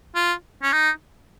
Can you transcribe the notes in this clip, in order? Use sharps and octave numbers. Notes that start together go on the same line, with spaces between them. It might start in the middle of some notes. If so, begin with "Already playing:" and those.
F4
C#4
D#4